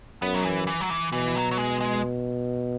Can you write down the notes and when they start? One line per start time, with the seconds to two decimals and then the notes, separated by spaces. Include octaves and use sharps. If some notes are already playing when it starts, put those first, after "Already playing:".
0.22 F#2 B3
0.34 F#3
0.45 E3
0.67 E3
0.80 F#3
0.90 E3
1.12 B2 E3
1.36 F#3
1.51 F#3
1.58 G#3
1.81 G#3